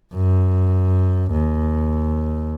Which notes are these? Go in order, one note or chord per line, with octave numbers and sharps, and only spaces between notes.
F#2
D#2